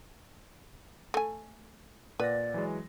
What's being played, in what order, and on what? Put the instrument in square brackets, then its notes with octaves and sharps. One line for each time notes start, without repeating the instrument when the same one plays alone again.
[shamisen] A3 G#5
[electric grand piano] A#2 F#5 A#6 [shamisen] B4 [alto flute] D5
[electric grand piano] E3 F#3 G#3